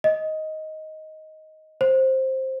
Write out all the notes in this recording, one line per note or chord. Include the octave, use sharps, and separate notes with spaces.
D#5
C5